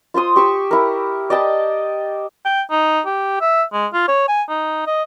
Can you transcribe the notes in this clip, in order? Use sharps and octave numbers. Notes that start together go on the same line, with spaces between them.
F4 C5 C6 D#6
G4 C#6 E6
E4 A#4
D5 D#5 G5 A5
G5
D#4
G4
E5
G#3
F4
C#5
G#5
D#4
D#5